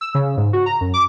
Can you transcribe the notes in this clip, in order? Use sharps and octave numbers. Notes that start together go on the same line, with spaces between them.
E6
C#3
G#2
F#4
A#5
F#2
D6